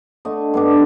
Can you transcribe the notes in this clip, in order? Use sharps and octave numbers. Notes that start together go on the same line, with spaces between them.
D3 A3 D#5
G2 B3 D4